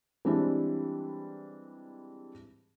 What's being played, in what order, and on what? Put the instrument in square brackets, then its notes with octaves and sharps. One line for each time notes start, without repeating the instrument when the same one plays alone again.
[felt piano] E3 G3 G#3 C4 D4 E4